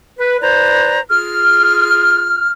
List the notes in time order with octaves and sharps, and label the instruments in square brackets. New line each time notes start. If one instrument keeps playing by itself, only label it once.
[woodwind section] B4
E4 B4 C5 D5 A#5
F4 G#4 F6